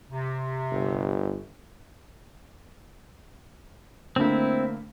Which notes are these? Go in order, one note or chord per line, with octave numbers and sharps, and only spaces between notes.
C3
G1
D3 A3 A#3 C4 E4